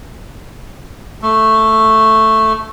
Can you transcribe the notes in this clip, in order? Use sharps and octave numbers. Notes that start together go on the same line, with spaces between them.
A3